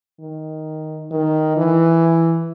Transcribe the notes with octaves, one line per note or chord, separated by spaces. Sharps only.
D#3
D#3
E3